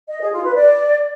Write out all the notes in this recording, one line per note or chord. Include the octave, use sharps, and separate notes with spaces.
D#5
G#4
F4
B4
D5